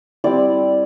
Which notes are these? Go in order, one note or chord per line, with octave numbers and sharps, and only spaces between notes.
G3 C4 E4 D5